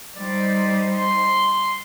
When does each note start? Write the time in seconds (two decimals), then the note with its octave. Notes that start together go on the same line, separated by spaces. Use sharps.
0.17 G3 D#4 C5 D5
0.92 C6